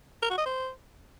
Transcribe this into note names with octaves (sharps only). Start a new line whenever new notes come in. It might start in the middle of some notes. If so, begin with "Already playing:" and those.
A#4
F#4
D#5
C5